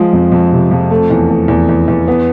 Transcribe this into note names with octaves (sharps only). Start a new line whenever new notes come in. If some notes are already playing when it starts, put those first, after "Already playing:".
Already playing: F3 G#3
F2
F2
C3
F2
A3
E2
A3
E2
E2
E2
B3